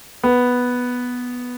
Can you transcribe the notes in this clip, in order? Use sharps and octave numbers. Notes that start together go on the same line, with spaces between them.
B3